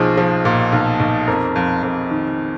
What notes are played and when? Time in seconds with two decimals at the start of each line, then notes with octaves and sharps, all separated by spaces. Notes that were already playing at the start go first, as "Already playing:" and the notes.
Already playing: B1 F3 G#4
0.17 F3
0.45 A#2
0.73 B1
1.00 B1
1.27 F2 A#4
1.56 F2
1.83 F2
2.11 D#3